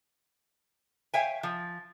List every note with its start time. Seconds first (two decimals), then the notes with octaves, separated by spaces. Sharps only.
1.14 C#5 E5 F5 G5 G#5
1.43 F3